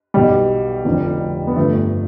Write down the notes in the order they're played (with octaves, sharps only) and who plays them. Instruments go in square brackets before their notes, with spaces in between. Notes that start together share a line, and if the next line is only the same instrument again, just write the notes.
[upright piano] B1 B2 G3
F1 F2 D3 F3
B3
G1 G2 F3 A3